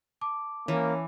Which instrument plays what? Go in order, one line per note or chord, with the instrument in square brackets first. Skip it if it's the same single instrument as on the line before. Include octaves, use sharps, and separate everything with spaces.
[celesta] A5 D6
[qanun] E3 [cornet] A#3 [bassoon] C#4